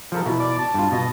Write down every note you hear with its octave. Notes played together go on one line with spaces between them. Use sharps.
F3 A4 A#4
B2 E4
D5
A5
G2 F4
B2 D#5